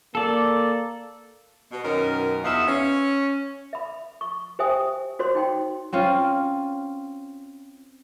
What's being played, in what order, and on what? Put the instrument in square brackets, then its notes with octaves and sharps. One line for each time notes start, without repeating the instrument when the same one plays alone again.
[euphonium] A#3 [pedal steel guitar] A4 D5
[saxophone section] B2
F#2 B2 D#3 C#4 A#4
E2 B3 D#4 F4 E5
C#4
[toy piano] E5 B5
C#6
G4 C5 E5 G5 G#5 D#6
F#4 C5 C#5 C6
D#4 G5 C6
[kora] C4 C#4 F4